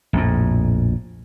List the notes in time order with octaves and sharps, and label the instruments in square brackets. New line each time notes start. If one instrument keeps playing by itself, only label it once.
[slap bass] A#1 F2 A2